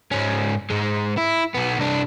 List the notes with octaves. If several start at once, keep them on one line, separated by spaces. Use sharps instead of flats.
G#2 C#4
G#2 G#3
E4
B1 B3
C2 D4